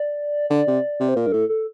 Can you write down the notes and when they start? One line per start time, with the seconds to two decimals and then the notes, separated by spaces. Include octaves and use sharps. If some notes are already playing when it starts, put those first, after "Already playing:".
Already playing: D5
0.50 D3 D5
0.67 C3
1.00 C3
1.09 C5
1.16 A#2 A#4
1.27 G2
1.32 A2 A4
1.49 A4